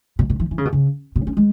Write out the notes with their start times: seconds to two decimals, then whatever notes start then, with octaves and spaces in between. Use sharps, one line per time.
0.19 B2
0.30 B2
0.40 E3
0.51 E3
0.58 C#3
0.65 B2
0.73 C#3
1.16 B2
1.27 C#4
1.37 G#3